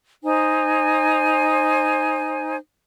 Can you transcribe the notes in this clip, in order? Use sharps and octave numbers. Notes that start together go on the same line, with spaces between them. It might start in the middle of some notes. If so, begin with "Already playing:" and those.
D#4 C5 G#5